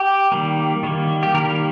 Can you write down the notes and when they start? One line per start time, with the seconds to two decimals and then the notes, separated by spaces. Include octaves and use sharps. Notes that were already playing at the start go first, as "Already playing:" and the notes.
Already playing: G4
0.32 D#3 G3 A#3
0.83 D#3 G3 A#3
1.23 G4
1.34 D#3 G3 A#3 A#4